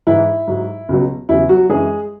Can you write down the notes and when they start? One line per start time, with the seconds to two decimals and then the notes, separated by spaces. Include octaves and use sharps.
0.07 G#2 E3 E4
0.48 G#2 F#3
0.89 C#2 B2 F#3
1.29 E2 C#3 F#3 E4
1.49 F#3 F#4
1.69 F#2 E3 G#3 G#4